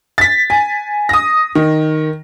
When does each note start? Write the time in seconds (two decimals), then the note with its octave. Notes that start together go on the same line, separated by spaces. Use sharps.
0.18 A6 B6
0.50 G#5
1.09 D#6 A#6
1.55 D#3